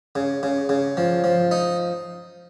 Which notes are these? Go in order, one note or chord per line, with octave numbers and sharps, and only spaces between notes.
C#3
C#3
C#3
F3
F3
D#4